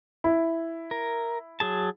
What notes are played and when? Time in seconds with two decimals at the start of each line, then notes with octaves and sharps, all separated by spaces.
0.24 E4
0.91 A#4
1.60 F#3 G#4 A5